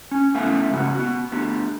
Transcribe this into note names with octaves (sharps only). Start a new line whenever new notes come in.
C#4
A3 B3 C#4 E4 E5 F5
G#2 C#3 C#4 F#4 F#5
B3 F#4
A3 B3 D4 G4